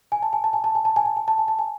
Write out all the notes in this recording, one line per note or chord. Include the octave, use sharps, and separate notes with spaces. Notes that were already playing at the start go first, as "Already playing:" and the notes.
G#5
A5
G#5
A5
G#5
A5
G#5
A5
G#5
A5
G#5
A5
G#5
A5
G#5